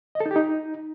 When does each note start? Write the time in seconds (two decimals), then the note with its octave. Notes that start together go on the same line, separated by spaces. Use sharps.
0.15 D#5
0.20 A4
0.26 D#4
0.31 G4
0.36 D#4